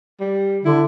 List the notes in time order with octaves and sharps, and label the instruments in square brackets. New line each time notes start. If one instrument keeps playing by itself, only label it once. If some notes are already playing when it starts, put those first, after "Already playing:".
[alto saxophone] G3
[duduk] D3 [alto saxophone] E4